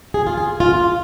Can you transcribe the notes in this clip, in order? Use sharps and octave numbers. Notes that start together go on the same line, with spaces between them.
G#4
F4
G#4
F4